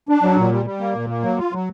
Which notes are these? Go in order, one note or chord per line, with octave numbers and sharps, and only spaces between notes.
D4
F#3
A#2
G3
G3
A#3
A#2
A#3
F#3
F4
F#3